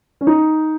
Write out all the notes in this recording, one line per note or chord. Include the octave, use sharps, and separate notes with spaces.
C#4
D#4